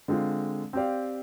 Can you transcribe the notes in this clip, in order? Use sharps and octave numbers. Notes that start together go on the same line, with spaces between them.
D3 G#3 C4 F4
C4 G4 D5 F5